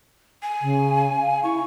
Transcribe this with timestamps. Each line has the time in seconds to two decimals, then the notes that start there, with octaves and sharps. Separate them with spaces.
0.43 G#5
0.62 C#3
1.21 F5
1.43 E4 C#6